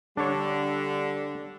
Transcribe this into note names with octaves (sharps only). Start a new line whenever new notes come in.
D3 G3 D4 C#5